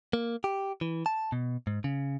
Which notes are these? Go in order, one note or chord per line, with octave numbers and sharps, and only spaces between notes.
A#3
G4
E3
A5
B2
G#2
C#3